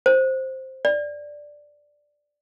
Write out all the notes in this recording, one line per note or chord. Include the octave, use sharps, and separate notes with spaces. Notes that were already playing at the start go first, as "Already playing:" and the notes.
C5
D5